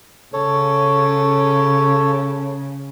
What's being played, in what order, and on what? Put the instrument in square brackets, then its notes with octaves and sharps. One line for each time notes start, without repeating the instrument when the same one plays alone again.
[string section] C#3 [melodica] A4 C#5